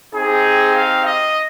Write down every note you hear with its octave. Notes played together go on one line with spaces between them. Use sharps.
C4 D#4 G4 G#4
F5
D#5